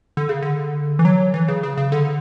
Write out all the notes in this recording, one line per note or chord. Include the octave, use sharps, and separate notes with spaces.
D3
C#3
D3
E3
F#3
E3
C#3
C#3
C#3
D3